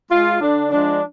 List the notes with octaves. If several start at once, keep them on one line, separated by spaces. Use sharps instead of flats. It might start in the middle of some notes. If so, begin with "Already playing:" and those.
G#3 F4
D3 D4
F3 G#3 D4